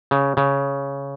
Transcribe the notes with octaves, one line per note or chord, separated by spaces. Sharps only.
C#3
C#3